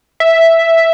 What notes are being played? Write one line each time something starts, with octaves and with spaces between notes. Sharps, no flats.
E5